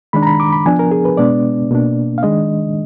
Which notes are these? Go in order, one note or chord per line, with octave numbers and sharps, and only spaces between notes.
D#3 G#3 D4 B5
A#5
B5
D6
B5
F3 B3 D4 G#5
A#4
G#4
B4
B2 G#3 B3 D4 D5
B2 A#3 D4
F5
D#3 G#3 D4 D#5